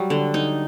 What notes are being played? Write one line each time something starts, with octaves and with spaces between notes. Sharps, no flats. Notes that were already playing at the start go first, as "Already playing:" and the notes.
Already playing: F#3 G3
D3
D#4